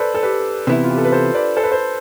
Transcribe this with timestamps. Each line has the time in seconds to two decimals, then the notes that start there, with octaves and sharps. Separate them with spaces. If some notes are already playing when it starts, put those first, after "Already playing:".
Already playing: A4 B4 C5 D5
0.15 A4
0.23 G4 B4
0.67 C3 E3 B3 E4
0.84 F4
0.91 G4
0.98 A4
1.05 B4
1.12 A4 C5
1.34 B4 D5
1.57 A4 C5
1.64 B4
1.71 A4 C5